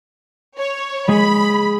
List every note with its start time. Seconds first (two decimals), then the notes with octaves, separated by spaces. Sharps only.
0.57 C#5
1.08 G#3 G#4 B5